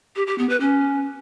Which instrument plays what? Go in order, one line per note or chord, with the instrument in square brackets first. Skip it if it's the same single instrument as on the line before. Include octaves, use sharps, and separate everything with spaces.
[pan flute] G4
G4
B3
B4
C#4